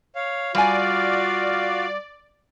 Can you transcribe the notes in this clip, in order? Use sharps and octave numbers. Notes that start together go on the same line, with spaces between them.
C#5 F5
G3 F4 F#4 D5 F5 G#5